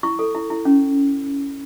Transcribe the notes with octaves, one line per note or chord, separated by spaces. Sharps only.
E4 C#6
A4
E4
E4
C#4